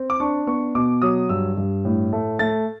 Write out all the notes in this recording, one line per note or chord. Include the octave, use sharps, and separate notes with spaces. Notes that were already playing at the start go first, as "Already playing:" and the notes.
Already playing: C4
D6
D4 C#6
B3 C#6
B2 D6
F#3 D#6
G2 E6
G2
A2
A3
A3 A6